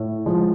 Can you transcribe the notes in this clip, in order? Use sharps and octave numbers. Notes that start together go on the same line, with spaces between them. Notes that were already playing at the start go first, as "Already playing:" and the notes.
Already playing: A2
F3 G#3